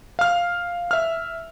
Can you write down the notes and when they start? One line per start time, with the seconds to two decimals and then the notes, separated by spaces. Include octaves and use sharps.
0.19 F5 F6
0.91 E5 F6